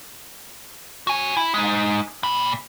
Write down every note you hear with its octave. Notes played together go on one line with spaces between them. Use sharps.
F#4 G#5
E4
G#3 D#4
A#2 B5